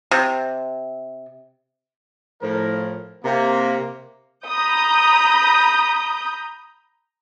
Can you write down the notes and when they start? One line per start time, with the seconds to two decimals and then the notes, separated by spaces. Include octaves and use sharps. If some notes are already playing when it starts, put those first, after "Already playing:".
0.11 C3
2.42 A2 F3 A#4
3.24 C3 A#3
4.45 A#5 B5 D#6 G6